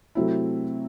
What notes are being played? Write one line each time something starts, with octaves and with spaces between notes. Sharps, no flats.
C3 F#3 A3 C4 E4